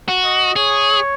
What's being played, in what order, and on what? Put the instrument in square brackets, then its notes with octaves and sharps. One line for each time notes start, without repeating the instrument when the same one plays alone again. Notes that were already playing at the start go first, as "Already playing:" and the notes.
[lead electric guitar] F#4
[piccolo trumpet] D#5
[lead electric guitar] G#4 [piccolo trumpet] C#5